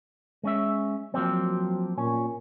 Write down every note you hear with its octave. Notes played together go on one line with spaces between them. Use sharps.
G#3 C#4 E5
F3 F#3 A#3 C4
A#2 C#4